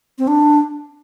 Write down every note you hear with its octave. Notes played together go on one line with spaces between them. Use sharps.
C4
D4